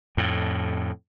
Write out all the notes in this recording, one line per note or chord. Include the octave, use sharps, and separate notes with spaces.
F2 A2